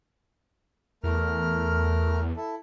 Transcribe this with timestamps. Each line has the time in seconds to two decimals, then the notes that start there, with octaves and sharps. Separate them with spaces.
1.04 E2 A3 A#4 F6
2.37 E4 A4